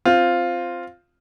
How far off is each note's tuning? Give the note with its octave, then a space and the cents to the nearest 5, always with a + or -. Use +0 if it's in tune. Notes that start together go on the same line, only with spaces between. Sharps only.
C4 +0 F4 +0